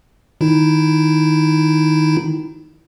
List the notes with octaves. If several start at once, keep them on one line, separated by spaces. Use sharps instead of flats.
D#3 D#4 E4